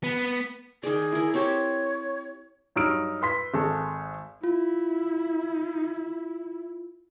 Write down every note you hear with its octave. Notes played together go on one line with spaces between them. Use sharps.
B3
D#3 G#4 D5
E4 A#4
C4 G4 C#5
G2 F#3 D#4 E6 F6 D7
B4 C6 B6
G#1 G#3 A4
E4 F4